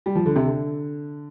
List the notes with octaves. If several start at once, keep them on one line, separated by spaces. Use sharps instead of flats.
G3
F3
D3
C3
D3